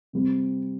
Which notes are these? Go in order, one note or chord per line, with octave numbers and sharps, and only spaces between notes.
C3 G3 C4